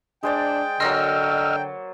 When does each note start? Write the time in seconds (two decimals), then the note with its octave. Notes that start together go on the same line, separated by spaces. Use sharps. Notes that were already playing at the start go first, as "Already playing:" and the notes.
0.23 G#3 D4 C5 D5 G5
0.80 D3 F#3 A#3 D#5 C6 E6 F6